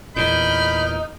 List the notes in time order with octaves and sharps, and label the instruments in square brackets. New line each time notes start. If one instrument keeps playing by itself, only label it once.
[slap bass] E2 A#2 [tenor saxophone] D#4 [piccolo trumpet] B5 [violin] F6 G6